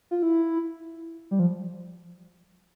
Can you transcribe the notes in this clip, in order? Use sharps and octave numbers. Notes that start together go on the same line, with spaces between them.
F4
E4
G3
F3